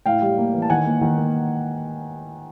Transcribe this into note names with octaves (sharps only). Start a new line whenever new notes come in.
A2 F5 G5
G3
A#3
E3
A5
D#3 F#5 G#5
A#3
D#3
A#3